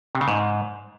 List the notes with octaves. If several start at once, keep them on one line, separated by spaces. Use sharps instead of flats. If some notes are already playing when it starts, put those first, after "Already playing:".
C3
C#3
G#2